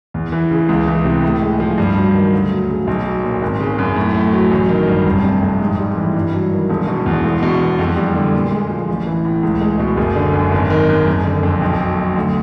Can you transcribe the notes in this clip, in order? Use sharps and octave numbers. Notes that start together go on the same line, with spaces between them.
E2
E3
C#3
C#2
E3
C3
A2
G#3
F3
G2
F#3
D#3
D2
F#3
C#3
B1
F#3
A#2
G#1
C#3
F#2
A2
A3
F#3
A1
D#3
G2
F1
C3
F2
G#2
G3
E3
G2
F#3
D#3
E1
B2
E2
E1
B2
E2
F2
G3
D3
A#2
G#3
F3
A1
E3
A2
C#2
G#3
B2
F#1
D3
F#2
G#1
D#3
F#2
F#1
D3
F2
B1
F#3
B2
D2